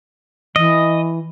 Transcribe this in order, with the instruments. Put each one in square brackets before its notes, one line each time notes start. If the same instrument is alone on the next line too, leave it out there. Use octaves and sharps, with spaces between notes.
[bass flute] E3 [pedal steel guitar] D#5